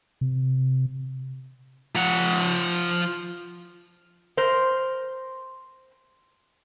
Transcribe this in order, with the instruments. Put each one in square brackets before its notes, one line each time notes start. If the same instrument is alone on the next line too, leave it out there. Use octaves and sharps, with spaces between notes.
[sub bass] C3
[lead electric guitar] F3 F#5
[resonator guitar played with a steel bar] A#4 C5